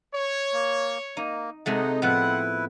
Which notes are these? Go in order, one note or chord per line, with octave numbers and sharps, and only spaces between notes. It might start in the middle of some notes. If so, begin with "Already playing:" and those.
C#5
A#3
A#3 D#4
C3 G#3 A3 D#4 F#5
A2 F3 B3 C4 E4 B4 F#5